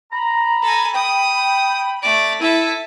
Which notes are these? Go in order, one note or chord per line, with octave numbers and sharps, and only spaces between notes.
A#5 B5
A4 G#5
G5 D#6
A3 D5 D7
E4 A4 E5 D#7